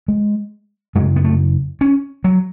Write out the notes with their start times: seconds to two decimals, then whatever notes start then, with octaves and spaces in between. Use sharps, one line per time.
0.08 G#3
0.95 F#2 G#3
0.99 C#3
1.16 B3
1.24 A3
1.81 C#4
2.24 F#3